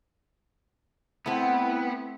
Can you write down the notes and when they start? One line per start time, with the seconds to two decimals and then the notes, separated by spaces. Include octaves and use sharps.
1.26 A3 B3 C4 E4 F#5 G5 F#6